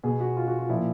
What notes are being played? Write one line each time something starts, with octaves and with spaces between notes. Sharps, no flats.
B2 G#4
F#4
F4
F#4
F4
A#2 F3 E4